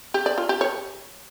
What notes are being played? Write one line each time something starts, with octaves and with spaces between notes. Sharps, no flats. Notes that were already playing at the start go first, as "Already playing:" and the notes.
G4
D5
F4
G4
C#5